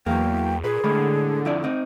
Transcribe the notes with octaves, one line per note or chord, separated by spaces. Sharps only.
E2 F#3 A#3 G5
A#2 G#4 B4
A2 D3 G#3 B5
F2 E4 D5
C4 D#4